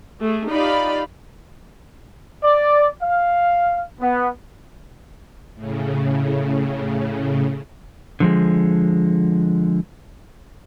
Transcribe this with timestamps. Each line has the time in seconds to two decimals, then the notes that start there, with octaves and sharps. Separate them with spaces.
0.22 A3 G#4
0.50 D#4 F4 G4 D5 F5 B5
2.43 D5
3.01 F5
4.00 B3
5.55 A2 C#3
8.20 D3 F3 G#3